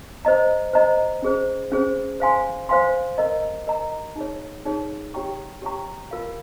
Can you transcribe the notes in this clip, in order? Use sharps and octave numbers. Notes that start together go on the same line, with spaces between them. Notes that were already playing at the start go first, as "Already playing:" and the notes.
C5 D#5 A#5
C5 D#5 A#5
C#4 G#4 C5
C#4 G#4 C5
C5 F5 G#5 C6
C5 F5 G#5 C6
A#4 D#5 A#5
A#4 D#5 A#5
D#4 G#4 C#5
D#4 G#4 C#5
G4 C#5 G5 A#5 C#6
G4 C#5 G5 A#5 C#6
F4 A#4 F5